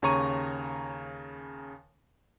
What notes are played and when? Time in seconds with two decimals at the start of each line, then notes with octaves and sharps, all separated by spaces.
0.02 D#2 C#3 C#5 A#5 C#6 D#7